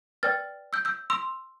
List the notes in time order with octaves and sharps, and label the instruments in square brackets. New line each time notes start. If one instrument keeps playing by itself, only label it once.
[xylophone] B4 D5 G5 F6 A6
E6 G6
E6 G6
C6 E6